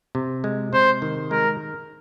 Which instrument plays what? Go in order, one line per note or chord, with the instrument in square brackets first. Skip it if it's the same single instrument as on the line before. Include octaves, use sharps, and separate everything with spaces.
[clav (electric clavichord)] C3
G#3
[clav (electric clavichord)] C3 [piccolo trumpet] C5
[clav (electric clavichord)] D#3
[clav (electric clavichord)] G#3 [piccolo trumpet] A#4